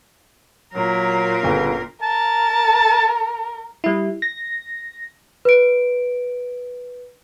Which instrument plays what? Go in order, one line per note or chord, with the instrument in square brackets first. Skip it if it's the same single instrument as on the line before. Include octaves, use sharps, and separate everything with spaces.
[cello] A#2 A#4 [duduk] F#3
[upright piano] G1 C#3
[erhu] A#4 [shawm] A5
[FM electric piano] G3 E4
A#6
[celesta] B4 D7